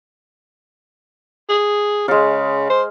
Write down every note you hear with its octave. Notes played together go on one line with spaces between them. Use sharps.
G#4
C#3 G#3 F5
C5